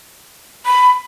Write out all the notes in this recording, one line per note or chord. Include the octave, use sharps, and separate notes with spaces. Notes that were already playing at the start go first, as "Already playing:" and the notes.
B5